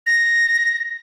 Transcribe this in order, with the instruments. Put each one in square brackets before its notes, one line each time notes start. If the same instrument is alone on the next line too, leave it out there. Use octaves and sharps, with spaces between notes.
[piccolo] A#6